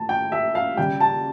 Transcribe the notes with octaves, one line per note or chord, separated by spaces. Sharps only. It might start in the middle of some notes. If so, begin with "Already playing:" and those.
Already playing: A2 A5
G5
E5
F5
C#3 G3 G5
A5